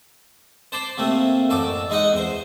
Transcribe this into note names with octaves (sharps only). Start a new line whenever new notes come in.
C5 A5 B5 C6 D6
C3 A3 A#3
A1 F#2 A4 A5 D6
G#3 D#4 D#5 F#5
E2 C5